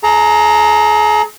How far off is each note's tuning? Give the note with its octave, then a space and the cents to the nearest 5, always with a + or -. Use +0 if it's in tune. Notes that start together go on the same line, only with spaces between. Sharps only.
G#4 +40 A#5 -5